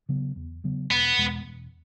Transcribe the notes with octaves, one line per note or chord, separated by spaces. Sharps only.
C#3 F#3 B3
E2
C#3 F#3 B3
E1 B3
E2 B2 G#3
E1